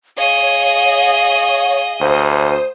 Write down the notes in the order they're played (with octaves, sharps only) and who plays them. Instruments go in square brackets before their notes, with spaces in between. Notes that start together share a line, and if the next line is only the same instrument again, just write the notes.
[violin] G#4 D#5 [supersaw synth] C#5 [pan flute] F5
[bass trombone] D2 [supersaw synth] C5 D#6